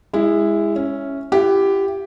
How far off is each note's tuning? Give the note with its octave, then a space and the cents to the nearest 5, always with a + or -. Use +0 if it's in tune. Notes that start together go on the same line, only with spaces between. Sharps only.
G#3 -25 E4 +0
C#4 +0 E5 +0
E4 +45 G4 +0 F#5 +15